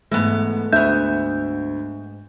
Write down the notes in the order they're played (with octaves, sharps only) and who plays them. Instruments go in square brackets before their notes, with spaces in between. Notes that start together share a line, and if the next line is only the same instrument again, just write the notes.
[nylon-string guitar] G#2 A3 [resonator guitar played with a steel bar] E3 B3
[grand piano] D2 [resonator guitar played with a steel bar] B3 E5 [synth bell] G6